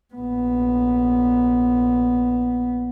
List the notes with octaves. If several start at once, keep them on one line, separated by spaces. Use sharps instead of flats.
A#1 B3